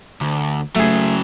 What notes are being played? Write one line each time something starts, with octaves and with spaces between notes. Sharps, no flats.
D2
C#3 F#3 A3 G#4